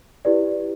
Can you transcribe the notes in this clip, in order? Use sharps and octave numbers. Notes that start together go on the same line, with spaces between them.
E4 G4 B4 D5